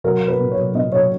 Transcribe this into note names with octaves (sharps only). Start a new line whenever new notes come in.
F#3 A#4
F#3
B4
A#2
C#5
F#3
A#2 D#5
F#3 C#5